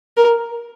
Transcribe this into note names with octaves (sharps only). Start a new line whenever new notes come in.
A#4